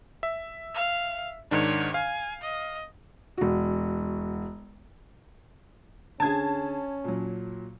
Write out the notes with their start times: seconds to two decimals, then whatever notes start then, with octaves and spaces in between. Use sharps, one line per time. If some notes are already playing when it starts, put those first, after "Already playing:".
0.23 E5
0.74 F5
1.51 G#2 D#3 D4 C#5
1.94 F5 G#5
2.42 D#5
3.38 E1 F#4
6.20 D3 C#4 G#4 A5 G#6
7.04 A#2 F#3